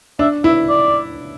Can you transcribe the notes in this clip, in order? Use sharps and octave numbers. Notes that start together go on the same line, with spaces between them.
D4 E5
E4 E5
D5